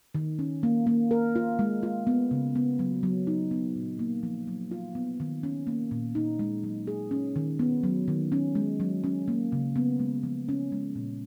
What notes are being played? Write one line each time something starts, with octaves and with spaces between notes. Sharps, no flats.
D#3
C#4
A#3
A#3
A#4
F4
G#3
F4
B3
C#3
B3
F#3
F#3
D#4
B3
A#2
A#3
F3
F#3
F4
B3
D#3
C#4
A#3
A#2
D#4
G#3
F#3
G#4
C#4
D#3
B3
F#3
D#3
C#4
G#3
F#3
C#4
A#3
C#3
B3
G#3
F3
C#4
G#3
A#2